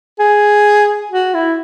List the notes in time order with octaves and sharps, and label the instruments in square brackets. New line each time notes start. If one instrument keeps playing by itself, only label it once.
[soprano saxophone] G#4
F#4
E4